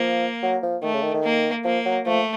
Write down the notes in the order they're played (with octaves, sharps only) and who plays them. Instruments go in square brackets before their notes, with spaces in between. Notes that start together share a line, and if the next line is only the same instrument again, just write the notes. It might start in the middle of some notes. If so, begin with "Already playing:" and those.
Already playing: [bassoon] F3 [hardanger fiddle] A#3
[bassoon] F#3
F3
[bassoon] D#3 [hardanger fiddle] A3
[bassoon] C#3
D#3
D#3
[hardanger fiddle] A#3
[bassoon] F3 [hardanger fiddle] A#3
[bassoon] F#3
[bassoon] F3 [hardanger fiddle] A3